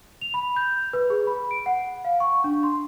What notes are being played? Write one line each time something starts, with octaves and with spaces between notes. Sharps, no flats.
F7
B5
G6
B4
G#4
B5
D7
F#5
F5
C#6
D4
C6